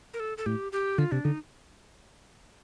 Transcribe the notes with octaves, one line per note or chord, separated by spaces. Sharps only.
A#4
A4
A4
A2 G4
G4
D3 F4
C3 D4
D3 D#4